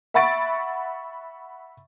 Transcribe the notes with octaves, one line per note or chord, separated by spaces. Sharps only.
E5 F#5 B5 C#6 A6 D7